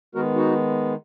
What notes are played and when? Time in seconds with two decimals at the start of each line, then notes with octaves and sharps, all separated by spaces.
0.15 D#3 G#3 B3 F#4 A#4
0.36 D#4 F#4